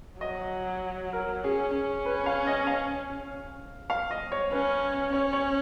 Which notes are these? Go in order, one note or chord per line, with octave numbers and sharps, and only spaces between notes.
F#3 D#5
A#4
C#4 G#4
C#4
B4
F5
D#5
F5
F5
D#5
C#5
C#4 B4
C#4 C#5
C#5